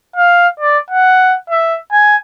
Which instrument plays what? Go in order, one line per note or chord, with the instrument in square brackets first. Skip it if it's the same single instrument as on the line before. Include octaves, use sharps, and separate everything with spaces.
[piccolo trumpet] F5
D5
F#5
E5
G#5